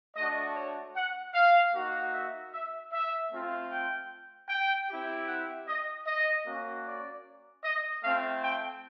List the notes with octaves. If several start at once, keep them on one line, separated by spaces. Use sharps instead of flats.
A3 D4 F#4 D#5
C#5
F#5
F5
A#3 D#4 F#4
E5
E5
E5
A3 C4 F4
G5
G5
C4 E4 G4
F#5
D#5
D#5
A#3 C#4 F#4
D5
D#5
A3 C4 F4 F5
G5